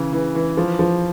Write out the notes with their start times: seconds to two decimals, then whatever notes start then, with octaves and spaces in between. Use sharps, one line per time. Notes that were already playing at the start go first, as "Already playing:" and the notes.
Already playing: C#3 E3
0.13 E3
0.35 E3
0.57 F3
0.79 F3